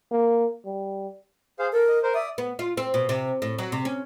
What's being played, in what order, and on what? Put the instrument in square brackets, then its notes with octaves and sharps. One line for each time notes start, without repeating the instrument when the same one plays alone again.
[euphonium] A#3
G3
[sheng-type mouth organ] G#4 C5 F5
[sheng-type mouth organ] A4 [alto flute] A#4
[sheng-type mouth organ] D#5
A#4 C5
[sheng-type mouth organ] D5 D#6 [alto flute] E5
[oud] B3
F4
C4
B2
C3
A2
F#3
C3
C#4